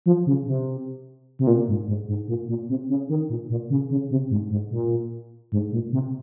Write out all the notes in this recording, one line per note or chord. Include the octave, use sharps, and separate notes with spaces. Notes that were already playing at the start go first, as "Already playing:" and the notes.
F3
C#3
C3
C3
A#2
G#2
G#2
G#2
A#2
A#2
C3
C#3
D#3
A#2
A#2
C#3
C#3
C3
G#2
G#2
A#2
G#2
A#2
C3